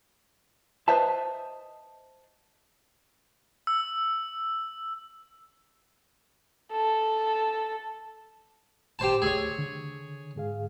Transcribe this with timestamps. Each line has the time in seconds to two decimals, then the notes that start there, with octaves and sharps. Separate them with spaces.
0.88 B4 C5 D#5 E5 A5
3.67 E6
6.71 A4
8.99 A2 G4 C5 A5
9.22 D2 A3 G#4 C#5 E6
9.58 D3
10.36 G#2 G#4 F5